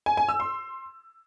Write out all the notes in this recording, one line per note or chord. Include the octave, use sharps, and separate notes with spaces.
G#5
G#5
E6
C6